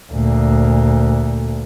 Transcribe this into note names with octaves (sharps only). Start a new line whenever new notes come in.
D2 A#2